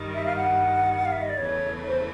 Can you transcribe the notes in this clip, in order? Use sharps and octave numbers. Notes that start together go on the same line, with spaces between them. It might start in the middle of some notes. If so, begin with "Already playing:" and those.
Already playing: G2 D#3 G3
E5
F5
F#5
F5
E5
D#5
D5
E2 C#3 E3 A3 C#5
C5